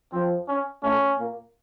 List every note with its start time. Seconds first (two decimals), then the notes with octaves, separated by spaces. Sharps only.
0.13 F2 F3 C4
0.48 C#4
0.83 A2 A3 C#4
1.19 A#2 A#3